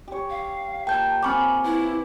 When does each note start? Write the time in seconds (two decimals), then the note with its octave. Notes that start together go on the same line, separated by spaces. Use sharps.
0.08 G4 C#5
0.30 F5
0.87 A#3 F4 G5 A5 G6
1.23 C4 G#5 B5 C#6 D6
1.65 E4 B4